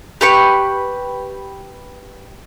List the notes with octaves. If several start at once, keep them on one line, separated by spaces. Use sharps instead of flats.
G4 B4 C#6